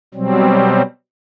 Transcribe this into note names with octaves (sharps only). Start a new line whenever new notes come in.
B2 F#3 G3 C4